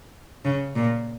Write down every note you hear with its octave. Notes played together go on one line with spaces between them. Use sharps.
C#3
A#2